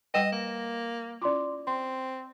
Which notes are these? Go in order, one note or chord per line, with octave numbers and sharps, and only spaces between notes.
G3 B4 D#5 F#5 G5 E7
A#3
C#4 E4 F4 D5 C6 D6
C4 C6